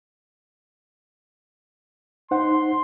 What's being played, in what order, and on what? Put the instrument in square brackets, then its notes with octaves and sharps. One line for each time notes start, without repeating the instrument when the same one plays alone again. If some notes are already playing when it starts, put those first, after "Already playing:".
[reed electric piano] D#4 C5 F#5 [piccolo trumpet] C6